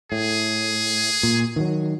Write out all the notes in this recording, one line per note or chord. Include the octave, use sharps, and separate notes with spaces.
A2 G#4
A#2
D#3 E3 F#3